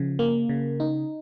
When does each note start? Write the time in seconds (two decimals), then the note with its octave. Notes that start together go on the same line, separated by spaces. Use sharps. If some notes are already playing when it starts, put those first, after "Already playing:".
Already playing: C#3 F3
0.19 A#3
0.49 C#3
0.80 D#4